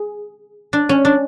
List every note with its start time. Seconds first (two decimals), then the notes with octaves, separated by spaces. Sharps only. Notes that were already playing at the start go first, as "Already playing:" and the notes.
Already playing: G#4
0.73 D4
0.89 C#4
1.05 D4